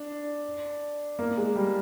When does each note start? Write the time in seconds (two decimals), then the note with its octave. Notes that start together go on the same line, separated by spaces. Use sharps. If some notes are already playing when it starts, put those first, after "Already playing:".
Already playing: D4
1.19 A#3
1.37 G#3
1.56 G3